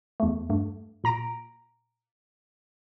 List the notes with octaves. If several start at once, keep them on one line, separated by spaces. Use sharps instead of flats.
E2 A3
G2 A3
A#2 A#5 A#6 D7